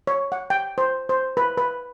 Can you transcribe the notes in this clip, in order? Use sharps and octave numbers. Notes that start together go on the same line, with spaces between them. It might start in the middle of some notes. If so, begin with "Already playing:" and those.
C#5
F#5
G5
C5
C5
B4
B4